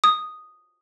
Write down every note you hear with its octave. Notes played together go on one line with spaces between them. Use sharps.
D#6